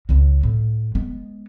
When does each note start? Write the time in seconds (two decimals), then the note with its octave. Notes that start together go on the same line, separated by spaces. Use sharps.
0.09 C#2 C#3
0.43 A2
0.95 G#3 B3